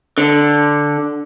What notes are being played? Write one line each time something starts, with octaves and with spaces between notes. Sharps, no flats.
D3